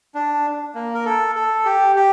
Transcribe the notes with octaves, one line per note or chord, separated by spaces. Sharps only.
D4
A#3
A#4
A4
A4
G4
G4